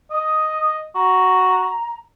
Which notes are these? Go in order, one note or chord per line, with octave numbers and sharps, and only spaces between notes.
D#5 D#6
F#4 A#5